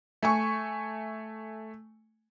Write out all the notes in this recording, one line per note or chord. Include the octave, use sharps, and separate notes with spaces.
A3 G#5 C#6